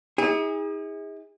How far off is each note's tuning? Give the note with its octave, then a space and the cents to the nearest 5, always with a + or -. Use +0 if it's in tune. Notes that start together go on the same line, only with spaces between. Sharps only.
D#4 +45 G#4 -30